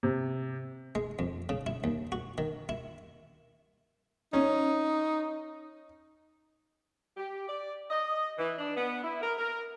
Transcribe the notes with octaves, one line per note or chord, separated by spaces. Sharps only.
C3
G#3
F2
C#3
E4
D#2
F#4
D#3
E4
C#4 D#4
G4
D5
D#5
E3
D4
B3
E4
A#4
A#4